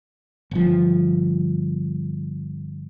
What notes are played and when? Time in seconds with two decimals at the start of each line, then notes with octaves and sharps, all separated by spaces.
0.51 G1 F3